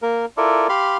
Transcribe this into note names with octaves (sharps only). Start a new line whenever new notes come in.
A#3 A#4
E4 F4 A4 A#4 D5
G4 F5 B5 C6